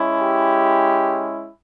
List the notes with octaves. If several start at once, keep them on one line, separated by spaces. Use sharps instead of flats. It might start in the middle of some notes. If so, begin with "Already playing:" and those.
Already playing: G#3 C#4 E4
G4